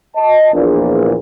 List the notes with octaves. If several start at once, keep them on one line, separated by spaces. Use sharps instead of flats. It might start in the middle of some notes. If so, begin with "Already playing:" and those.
D#5 A5
A#1 E2 A#2